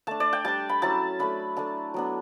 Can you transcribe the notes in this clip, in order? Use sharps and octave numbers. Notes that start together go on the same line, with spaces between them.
A3 D4 A5
D5
G5
G3 D4 A5
B5
F#3 C#4 E4 A5
A3 D4 B5
A3 D4 A5
F#3 B3 D4